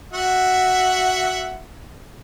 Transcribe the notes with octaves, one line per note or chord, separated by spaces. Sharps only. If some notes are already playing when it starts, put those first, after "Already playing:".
F#4 E5 F#5